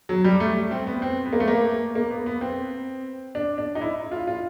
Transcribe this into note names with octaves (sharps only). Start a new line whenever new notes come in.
F#3
G3
A3
C4
B3
C4
B3
A#3
A3
A#3
A#3
B3
B3
C4
D4
D4
D#4
E4
F4
F4